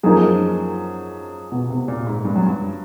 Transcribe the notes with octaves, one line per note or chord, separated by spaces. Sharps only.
F#2 F3 A#3 D#4 G#4
B2
C3
A#2
G#2
G2
F#2
G2